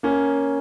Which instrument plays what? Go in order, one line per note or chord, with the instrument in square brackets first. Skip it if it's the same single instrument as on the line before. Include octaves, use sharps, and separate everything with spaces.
[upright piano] A#3 C#4